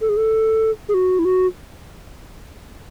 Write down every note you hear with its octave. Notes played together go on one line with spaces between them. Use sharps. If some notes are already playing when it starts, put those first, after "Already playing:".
A4
G#4
A4
G#4
F#4
E4
F#4